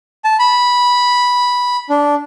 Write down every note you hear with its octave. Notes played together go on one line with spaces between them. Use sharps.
A5
B5
D4